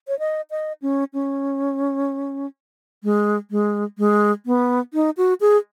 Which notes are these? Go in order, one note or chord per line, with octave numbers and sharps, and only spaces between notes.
C#5
D#5
D#5
C#4
C#4
G#3
G#3
G#3
B3
D#4
F#4
G#4